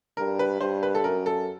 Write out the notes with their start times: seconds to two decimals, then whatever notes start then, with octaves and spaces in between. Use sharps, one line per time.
0.17 G2 A#4
0.39 B4
0.61 G2 C5
0.83 B4
0.95 A4
1.04 F#2 A#4
1.26 A4